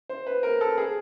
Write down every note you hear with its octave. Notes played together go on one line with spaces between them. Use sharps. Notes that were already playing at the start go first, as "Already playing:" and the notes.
C5
B4
A#4
A4
G#4